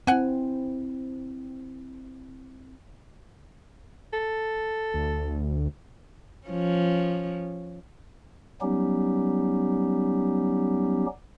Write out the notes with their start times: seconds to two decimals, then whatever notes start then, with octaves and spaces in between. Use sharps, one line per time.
0.07 C4 E4 F#5 G#5
4.13 A4
4.94 D2
6.47 F3 C#4
8.61 F#3 G3 B3 C#4 D#4 G4